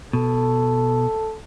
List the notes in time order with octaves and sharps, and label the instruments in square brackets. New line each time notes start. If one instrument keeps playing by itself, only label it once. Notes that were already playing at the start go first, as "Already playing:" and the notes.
[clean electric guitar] B2 [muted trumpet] A4